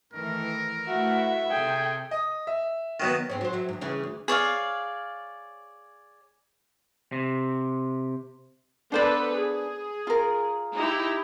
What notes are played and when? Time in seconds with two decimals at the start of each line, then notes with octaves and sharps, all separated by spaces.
0.13 D#3 E3 A3 A#4
0.87 A3 E4 F#4 B4 E5
1.50 C3 G#4 A4 G5
2.11 D#5
2.47 E5
3.00 D#3 F#3 B3
3.30 G#2 C4 C#4
3.41 F#3 C5
3.53 F#3 E5
3.69 D#2 G#2
3.81 C#3 E3
4.03 D2
4.28 G#4 C#5 D5 F5
7.12 C3
8.92 B3 D4 A4 B4 C5 D5
9.34 G#4
10.07 F4 A#4
10.75 D#4 E4 G4